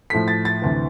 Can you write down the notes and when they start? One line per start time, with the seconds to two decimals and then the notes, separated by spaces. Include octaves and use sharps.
0.10 A2 F3 A3 B6
0.28 A6
0.45 A6
0.62 D2 C3 E3